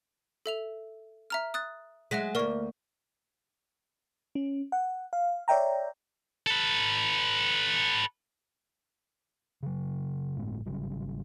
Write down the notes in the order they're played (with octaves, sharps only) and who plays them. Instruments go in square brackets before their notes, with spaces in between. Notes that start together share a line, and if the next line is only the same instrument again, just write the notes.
[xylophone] A4 E5 F7
E5 A#5 F6
D#6 F#6 A6
[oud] F#3 G#3 [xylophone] E5 A#6 B6
[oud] D2 A#3 [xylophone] A#4 D5 C#6
[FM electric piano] C#4
F#5
F5
C#5 D5 E5 G5 A#5
[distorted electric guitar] A4 B4
[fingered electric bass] C#3 F#3
G1 A2 G#3 B3
G#1 C#3 F#3 G3